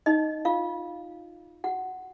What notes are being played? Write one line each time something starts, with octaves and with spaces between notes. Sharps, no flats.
D#4 D#5
F4 F5
F#4 F#5